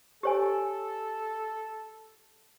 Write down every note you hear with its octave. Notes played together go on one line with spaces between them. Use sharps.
G4 A4 C#5 G#5